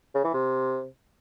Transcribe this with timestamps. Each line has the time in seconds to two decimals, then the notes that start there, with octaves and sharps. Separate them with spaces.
0.14 C#3
0.24 E3
0.34 C3